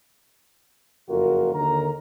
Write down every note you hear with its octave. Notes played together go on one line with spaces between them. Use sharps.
F#1 F2 F4 F#4 A#4
D#2 D3 A#4 A#5